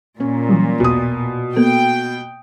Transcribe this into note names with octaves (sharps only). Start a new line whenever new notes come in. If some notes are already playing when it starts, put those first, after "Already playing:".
A#2 C#4
E3 F#3 G3
B1 E2 B2 D#6
A#3 B3 A4 G5